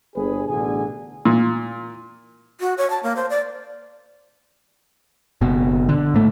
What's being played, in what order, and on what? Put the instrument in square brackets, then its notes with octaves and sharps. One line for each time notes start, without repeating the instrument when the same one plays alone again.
[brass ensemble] G1 G#4 B4
A1 B2 D3 G#4 G#5
[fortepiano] A#2
[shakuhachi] F#4
C#5
A5
A#3
C5
D5
[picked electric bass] F#1 B2
D3
G#2 A3